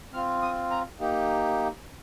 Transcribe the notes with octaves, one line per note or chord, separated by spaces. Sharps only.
C4 F4 F6
D#6
A#5
A#3 D#4 G4